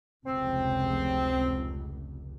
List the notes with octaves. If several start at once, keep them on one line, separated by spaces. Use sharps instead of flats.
F1 C#2 C4